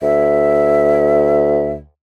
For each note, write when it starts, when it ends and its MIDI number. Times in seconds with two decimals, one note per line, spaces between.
0.02 1.84 38
0.02 1.71 76